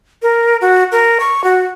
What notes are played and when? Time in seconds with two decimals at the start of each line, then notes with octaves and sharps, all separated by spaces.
0.22 A#4
0.61 F#4
0.92 A#4
1.20 C#6
1.44 F#4